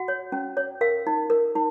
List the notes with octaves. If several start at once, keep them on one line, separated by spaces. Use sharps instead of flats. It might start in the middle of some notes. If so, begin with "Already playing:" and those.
Already playing: F#4 F#5
C#5
C#4
C#5
A#4 F5
D#4
A#4
D#4